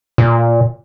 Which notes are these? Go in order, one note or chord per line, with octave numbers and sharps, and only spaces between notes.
A#2